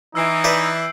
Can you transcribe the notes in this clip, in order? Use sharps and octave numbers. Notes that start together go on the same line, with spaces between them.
E3 D#4 E6 C7 D7
B4 D5 E5 G6 F#7